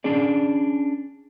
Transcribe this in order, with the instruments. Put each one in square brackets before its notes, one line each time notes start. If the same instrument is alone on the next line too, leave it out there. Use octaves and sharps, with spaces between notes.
[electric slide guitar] C#4 D4 G#4 D5